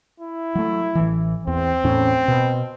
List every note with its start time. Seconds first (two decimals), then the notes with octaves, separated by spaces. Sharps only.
0.20 E4
0.55 F#3 A3
0.95 A1 E3
1.47 E2 C4
1.84 E2 A2 C#4
2.28 B2